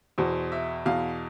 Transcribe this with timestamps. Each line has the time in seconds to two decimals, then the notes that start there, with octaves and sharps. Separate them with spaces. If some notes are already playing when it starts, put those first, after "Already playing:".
0.18 E2 B2 C5
0.52 E5
0.86 E2 B2 F5